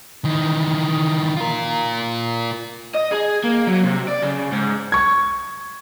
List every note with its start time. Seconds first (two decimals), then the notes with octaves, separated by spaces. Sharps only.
0.25 D#3 E3
1.37 F4 A#4
2.95 D#5
3.12 G#4
3.43 A#3
3.67 F#3
3.84 C3
4.08 D5
4.22 C#3
4.52 G#2
4.92 C#6 G#6